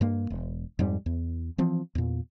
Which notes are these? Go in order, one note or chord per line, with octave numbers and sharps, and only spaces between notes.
G2 A#3
E1
F2 G#2 G3
E2
E3 F3 C4
E2 A#2